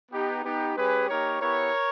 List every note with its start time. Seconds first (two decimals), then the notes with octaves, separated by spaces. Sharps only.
0.11 B3 D#4 G4
0.44 B3 D#4 G4
0.76 G#3 C#4 G4 G#4 B4
1.08 A#3 D#4 G4 A#4 C#5
1.40 B3 E4 G4 A#4 C#5